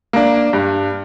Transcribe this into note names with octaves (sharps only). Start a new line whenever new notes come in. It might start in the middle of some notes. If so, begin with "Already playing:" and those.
A#3 D4
G2